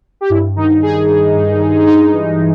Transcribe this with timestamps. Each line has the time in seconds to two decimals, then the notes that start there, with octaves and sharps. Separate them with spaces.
0.21 G4
0.30 G2 E4
0.56 D#3 D#4
0.82 G2 G#4
1.08 G2
1.35 G2
1.61 G2
1.87 G#3 D#4
2.13 E3